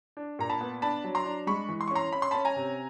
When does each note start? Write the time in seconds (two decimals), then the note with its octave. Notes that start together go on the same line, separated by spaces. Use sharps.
0.17 D4
0.39 A#2 A#5
0.50 A5 B5
0.61 B3
0.82 D4 A5 B5
1.04 F#3
1.15 A#5 C6
1.26 D4
1.47 G#3 B5 C#6
1.69 E3
1.81 C6
1.88 C#6
1.91 C#4 A#5 C6
2.12 C#4 B5
2.22 C6
2.31 C#4 A5 B5
2.45 G#5 A#5
2.56 C3